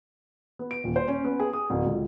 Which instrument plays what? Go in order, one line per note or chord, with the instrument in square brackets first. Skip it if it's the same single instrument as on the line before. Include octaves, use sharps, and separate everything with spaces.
[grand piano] B3
D7
D#1
C5
C#4
B3
G#4
D#6
D1
C#2